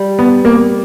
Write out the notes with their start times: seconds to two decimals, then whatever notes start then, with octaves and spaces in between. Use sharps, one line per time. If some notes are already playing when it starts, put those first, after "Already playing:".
Already playing: G3
0.19 B3
0.45 A#3